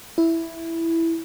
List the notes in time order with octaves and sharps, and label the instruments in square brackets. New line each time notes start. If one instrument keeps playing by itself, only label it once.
[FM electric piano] E4